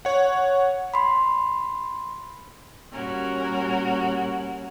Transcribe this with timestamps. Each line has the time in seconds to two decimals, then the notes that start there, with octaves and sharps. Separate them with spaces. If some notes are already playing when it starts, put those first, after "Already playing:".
0.05 C#5 F#5
0.94 B5 C6
2.93 A#2 G3 C#4 F#4 A#4